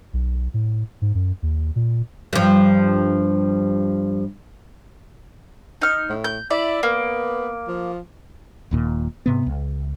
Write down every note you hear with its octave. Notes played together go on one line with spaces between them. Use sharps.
B1
A2
G#2
F#2
D#2
A#2
G2 F3
D#4 F6
A2
G6
E4 D5 E5
A#3 B3
F3
D#1 D#2 A#2
G#2 C3 B3
C#2